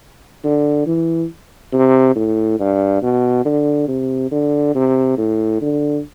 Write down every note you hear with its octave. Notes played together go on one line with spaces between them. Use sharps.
D3
E3
C3
A2
G2
B2
D3
C3
D3
C3
A2
D3